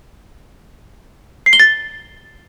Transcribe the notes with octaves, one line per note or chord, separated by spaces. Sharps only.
C7
G7
A6